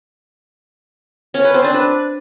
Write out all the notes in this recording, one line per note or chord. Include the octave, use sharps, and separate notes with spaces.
C#4
B4
C4
D4
B4